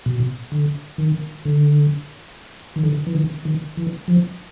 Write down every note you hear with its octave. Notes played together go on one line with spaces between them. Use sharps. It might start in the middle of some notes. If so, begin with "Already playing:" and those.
B2
D3
D#3
D3
D#3
D3
E3
D#3
D#3
E3
F3